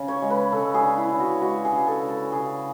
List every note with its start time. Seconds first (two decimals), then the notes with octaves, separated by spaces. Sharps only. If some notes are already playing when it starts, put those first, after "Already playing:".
Already playing: C#3
0.08 C#5
0.22 G#3
0.30 B4
0.52 C#3 A4
0.74 G#4
0.83 D4
0.97 E4
1.12 C#3
1.20 F#4
1.41 G#3 F#4
1.65 G#4
1.72 C#3
1.87 A4
2.01 C#3
2.09 A4
2.32 C#3 G#4